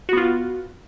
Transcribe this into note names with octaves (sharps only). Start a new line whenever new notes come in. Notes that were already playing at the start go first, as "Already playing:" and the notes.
B3 F4 F#4